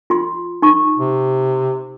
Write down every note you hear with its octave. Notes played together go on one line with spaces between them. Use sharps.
F4 C6
D#4 B5 C#6
C3